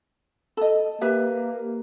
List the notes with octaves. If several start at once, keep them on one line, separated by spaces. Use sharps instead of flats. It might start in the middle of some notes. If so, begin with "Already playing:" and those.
A4 D#5
A#3 G4 B4 E5